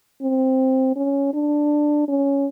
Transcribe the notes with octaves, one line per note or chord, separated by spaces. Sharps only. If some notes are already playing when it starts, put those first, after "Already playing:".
C4
C#4
D4
C#4